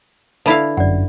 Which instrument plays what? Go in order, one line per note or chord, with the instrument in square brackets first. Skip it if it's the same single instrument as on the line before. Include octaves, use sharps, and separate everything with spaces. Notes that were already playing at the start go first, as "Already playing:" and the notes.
[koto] D3 E4 F5 [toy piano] B4 E5 B5
[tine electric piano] G1 F#2 [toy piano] D5 F#5